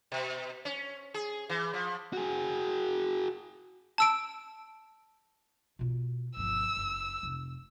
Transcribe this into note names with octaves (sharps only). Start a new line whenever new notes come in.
B2
C#4
G#4
E3
F3
F#4 G#4
A5 E6 D7
B2 F4
G1 F3 E6
F#1
F1